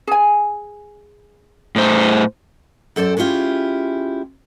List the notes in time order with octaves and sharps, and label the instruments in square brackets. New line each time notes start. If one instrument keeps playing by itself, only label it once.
[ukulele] G#4 G#5
[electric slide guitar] A2 C5
[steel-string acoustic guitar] F#2 A4 C5 D5
G#3 C#4 E4 F4 G4